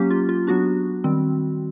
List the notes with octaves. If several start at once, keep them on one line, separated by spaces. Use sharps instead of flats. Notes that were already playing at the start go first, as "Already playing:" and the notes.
Already playing: F#3 A#3 C#4 G4
F4
F4
F#3 B3 D4 F#4
D#3 G3 C4